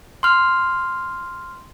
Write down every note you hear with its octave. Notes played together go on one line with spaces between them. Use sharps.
C6 F6